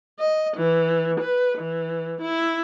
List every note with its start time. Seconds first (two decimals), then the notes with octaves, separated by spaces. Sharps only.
0.19 D#5
0.57 E3
1.20 B4
1.58 E3
2.21 E4